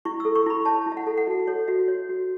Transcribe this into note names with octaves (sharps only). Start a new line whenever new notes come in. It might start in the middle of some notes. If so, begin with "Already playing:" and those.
E4 C#6
A4 E6
C#6
E4 B5
C#5 A5
E4
E5
F#5
A4
F#5
F#4 E5
A4 C#5
F#4 E5
C#5
F#4